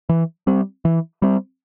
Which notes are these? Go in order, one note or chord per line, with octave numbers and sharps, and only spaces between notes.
E3
G3 C4
E3
G3 C4